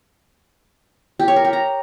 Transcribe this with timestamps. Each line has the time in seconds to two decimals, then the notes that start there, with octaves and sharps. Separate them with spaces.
1.19 G4
1.28 C#5
1.36 A#4
1.45 G4
1.53 A#5